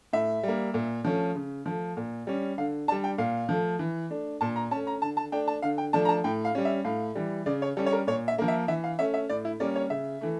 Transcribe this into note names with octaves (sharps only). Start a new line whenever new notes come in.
A2 E5
G3 A#3
A#2
F3 A3 C#4
C#3
F3 A3
A#2
G3 C#4
D3 F5
G3 D4 A5
G5
A#2 F5
F3 A3
E3
A3 D4
A#2 A5
A#5
A3 C#4 A5
A#5
D3 A5
A5
A3 D4 G5
A5
D3 F5
G5
F3 A3 D4 A5
A#5
A5
A2 G5
F5
G3 C#4
E5
A2 F5
E3 G3
C#3 D5
C#5
G3 C#4 A4
C#5
A#4
A#2 C#5
E5
F3 A#3
E5
E3 E5
F5
A3 C#4 E5
E5
A2 D5
E4
G3 A#3 C#4 D5
C#5
C#3 E5
E3 A3